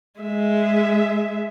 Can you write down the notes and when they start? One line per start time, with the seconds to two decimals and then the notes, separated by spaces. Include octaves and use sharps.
0.20 G#3 E5